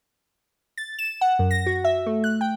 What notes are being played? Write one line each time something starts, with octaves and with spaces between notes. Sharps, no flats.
A6
E7
F#5
F#2
A#6
F#4
E5
A3
F#6
G5